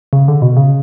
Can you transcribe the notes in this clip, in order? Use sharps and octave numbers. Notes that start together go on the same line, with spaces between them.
C#3
D3
B2
C#3